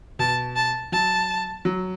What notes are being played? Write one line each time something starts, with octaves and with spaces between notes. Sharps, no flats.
B2 A5
A5
F#3 A5
F#3